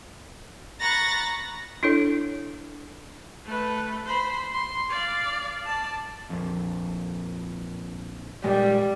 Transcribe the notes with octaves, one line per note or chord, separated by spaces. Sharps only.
A#5 B5 C#6 F#6 A6 A#6
D4 E4 A4 C#5
A3 B4
C5 B5
C6
D5 F5
D5 A5
A#1 F2
A#2 G3 G#3